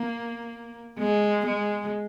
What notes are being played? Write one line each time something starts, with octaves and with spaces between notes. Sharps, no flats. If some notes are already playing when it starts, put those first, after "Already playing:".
Already playing: A#3
G#3
G#3